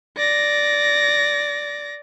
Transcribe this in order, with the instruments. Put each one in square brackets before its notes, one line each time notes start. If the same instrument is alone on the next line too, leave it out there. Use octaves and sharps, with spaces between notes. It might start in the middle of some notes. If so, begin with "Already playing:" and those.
[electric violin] D5 A#6